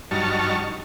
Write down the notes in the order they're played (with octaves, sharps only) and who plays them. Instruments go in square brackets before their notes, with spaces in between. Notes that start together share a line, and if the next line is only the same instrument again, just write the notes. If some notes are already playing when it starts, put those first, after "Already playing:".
[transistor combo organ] G2 F#3 D#4 A5 C#6 F6